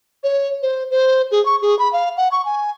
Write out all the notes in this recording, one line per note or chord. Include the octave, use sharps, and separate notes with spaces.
C#5
C5
C5
G#4
C#6
G#4
B5
F5
F#5
C#6
G#5